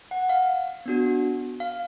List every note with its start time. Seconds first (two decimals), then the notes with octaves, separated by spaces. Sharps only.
0.11 F#5
0.29 F5
0.86 B3 D4 F#4
1.60 F5